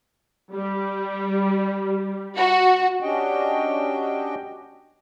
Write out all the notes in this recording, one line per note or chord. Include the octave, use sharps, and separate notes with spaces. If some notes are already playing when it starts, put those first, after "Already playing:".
G3
F#4
C#4 D4 F#4 G4 D#5 G5